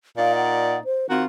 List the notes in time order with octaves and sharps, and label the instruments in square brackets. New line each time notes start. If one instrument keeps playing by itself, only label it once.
[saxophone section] A#2 D#4 D5 [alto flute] F5
[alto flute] F#5
C5
[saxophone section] D#3 F4 F#4 [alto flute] C4